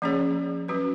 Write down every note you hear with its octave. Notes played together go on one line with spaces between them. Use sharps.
F3 A#3 C#4 G#4 C#5
F#3 C#4 F#4 B4